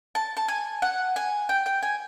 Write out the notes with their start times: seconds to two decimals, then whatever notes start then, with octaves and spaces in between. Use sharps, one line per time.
0.15 A5
0.37 A5
0.48 G#5
0.82 F#5
1.16 G#5
1.49 G5
1.66 G5
1.83 G#5